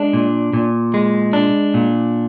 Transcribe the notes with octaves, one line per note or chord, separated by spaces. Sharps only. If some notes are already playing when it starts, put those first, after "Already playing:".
Already playing: G#3 D4
A#2
A#2
G#3
D4
A#2